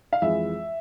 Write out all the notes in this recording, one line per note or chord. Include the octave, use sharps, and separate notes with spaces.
F5
F2 E3 G#3 E5